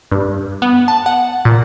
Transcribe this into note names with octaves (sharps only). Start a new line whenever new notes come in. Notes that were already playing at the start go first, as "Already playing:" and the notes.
G2
B3
A5
F#5
A#2